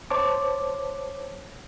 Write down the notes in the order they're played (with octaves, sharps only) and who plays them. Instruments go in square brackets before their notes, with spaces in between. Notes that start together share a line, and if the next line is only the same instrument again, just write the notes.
[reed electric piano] C5 C#5 A5 D6